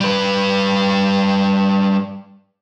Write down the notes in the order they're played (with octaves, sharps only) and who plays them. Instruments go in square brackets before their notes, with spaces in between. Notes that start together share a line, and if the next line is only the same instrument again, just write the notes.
[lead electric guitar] G3 B4